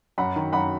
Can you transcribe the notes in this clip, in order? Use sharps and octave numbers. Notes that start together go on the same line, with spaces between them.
F#2 F#5 B5
D#3
F#2 F#5 B5